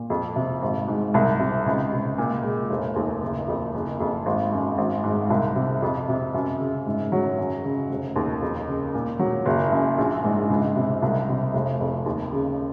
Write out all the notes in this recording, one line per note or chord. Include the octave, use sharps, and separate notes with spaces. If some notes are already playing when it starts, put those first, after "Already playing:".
Already playing: A#2
F2
C3
G#1
G#2
C2
C3
C#2
C3
A#2
G#3
F1
D#2
F#1
F2
F#1
F2
G#1
F#2
G#1
G#2
C2
C3
F2
C3
F#2
C#3
G#2
F#3
F#2
C#3
F1
D#2
F2
C#3
A#2
F#3
F#1
F#2
A#1
G#2
C#2
C3
C2
C3
F1
F2
D#2
C#3